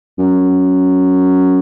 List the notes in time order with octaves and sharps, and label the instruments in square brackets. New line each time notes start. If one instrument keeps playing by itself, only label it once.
[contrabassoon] F#2